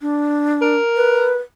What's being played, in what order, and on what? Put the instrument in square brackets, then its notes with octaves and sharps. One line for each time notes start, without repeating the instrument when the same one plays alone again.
[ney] D4
[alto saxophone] A#4
[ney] B4